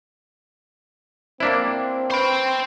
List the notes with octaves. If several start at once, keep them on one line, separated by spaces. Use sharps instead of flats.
A#3 C4 D4 E4 C5
B4 C5 G5 B5 C#6